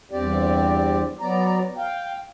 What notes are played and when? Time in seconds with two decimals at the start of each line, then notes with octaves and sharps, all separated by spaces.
0.11 E2 G2 C4 G4 D5
1.21 F#3 B3 D5 A#5
1.77 F5 G5